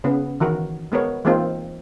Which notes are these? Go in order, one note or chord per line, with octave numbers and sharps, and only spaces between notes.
C#3 B3
D#3 E3 F#4 A#4
G#3 B3 A#4 C#5
E3 G#3 A#3 C4 D#4 F4